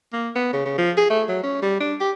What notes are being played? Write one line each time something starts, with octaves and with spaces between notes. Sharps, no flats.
A#3
B3
C#3
C#3
F3
G#4
A3
F#3
C#4
G3
D4
G4